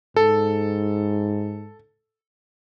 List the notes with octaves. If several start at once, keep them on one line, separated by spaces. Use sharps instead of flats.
G#2 A4